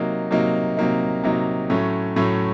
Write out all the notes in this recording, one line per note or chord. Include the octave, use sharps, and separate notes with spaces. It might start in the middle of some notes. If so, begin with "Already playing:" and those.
Already playing: C3 F#3 A#3 D#4
C3 F#3 A#3 D#4
C3 F#3 A#3 D#4
C3 F#3 A#3 D#4
A2 F#3 A3 C#4
A2 F#3 A3 C#4